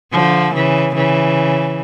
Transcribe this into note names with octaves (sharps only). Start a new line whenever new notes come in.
D3 F3
C#3 E3
C#3 E3